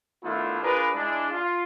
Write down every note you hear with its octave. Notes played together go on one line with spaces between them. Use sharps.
D#3 A3 B3 D4 E4 F4
D4 F4 G#4 A#4 B4
G#3 D4 E4
F4